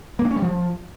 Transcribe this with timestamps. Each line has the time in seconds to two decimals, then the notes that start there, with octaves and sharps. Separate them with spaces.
0.19 A#3
0.25 D4
0.30 C#4
0.36 G3
0.42 F3